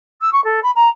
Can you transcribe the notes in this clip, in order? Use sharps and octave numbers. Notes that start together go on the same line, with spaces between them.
E6
C#6
A4
B5
A#5